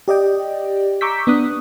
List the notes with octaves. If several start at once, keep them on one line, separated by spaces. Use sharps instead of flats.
G4 D5 D#5 G5
A#5 C#6 D6 E6 G6 B6
B3 D4 D#6 F#6